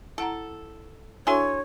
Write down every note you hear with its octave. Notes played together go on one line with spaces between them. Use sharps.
E4 A4 F#5 A#5
D4 E4 F#4 A4 C#5 G#5 C6